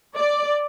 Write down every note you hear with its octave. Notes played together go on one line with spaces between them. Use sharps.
D5